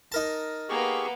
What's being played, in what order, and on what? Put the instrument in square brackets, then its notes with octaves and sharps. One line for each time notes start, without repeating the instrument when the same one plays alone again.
[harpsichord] D#4 A#4 A5
[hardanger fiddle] A#3 B3 [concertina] G4 G#4 C#6